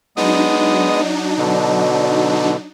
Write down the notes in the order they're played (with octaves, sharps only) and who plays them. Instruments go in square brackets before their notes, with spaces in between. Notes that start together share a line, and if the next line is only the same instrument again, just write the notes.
[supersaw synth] F#3 D4 D#4 [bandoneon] G#3 B3 D#6
[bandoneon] B2 D3